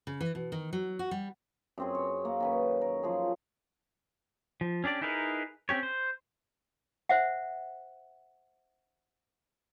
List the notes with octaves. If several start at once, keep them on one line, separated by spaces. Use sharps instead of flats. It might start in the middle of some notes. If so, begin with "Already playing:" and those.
C#3
E3
B2
D#3
F#3
F#4
G3
F#2 C4 G#4
C#5
A#3
D#3 C#4 B4
A#4
F3 F#3 G#4
F3
C#4 D4 G4 D5
D#4 E4 G#4 A#4 B4
C4 C#4 G4 C#5
C5
C5 E5 F#5